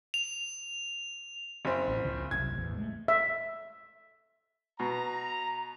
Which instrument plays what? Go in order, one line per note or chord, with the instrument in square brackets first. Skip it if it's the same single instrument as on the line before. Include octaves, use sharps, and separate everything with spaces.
[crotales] F7
[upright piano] F#1 C4
[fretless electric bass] A1
C#2 C#3 F3
[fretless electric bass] F#1 C2 F#2 [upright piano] G#6
[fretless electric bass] A1 E2
G#3 A3
[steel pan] E5
[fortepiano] B2 [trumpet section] A#5